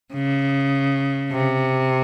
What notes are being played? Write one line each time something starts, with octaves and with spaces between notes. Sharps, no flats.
C#3
C3